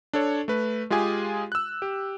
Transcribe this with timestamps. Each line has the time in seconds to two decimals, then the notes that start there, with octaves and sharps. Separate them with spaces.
0.13 D4 A4 C#5
0.48 A3 B4
0.90 G#3 F4 G4 G#4 G#5
1.52 E6 F#6
1.82 G4